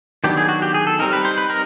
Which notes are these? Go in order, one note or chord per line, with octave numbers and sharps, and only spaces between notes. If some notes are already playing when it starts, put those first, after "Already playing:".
D#3 F#3 B3 D4 G4
G#4
F#4
G4
G#4
A4
G3 C4 D#4 A#4
B4
C5
B4
A#4